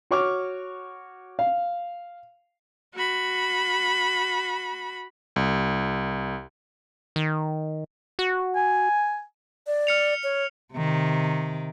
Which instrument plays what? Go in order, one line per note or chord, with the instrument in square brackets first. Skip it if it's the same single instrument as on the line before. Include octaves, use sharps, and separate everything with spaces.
[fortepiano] F#4 C#5 C#6 D6 F6
F5
[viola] F#4 B5
[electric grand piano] C2
[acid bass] D#3
F#4
[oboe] G#5
[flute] D5
[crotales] F6 C#7 F7
[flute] C#5
[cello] C3 D#3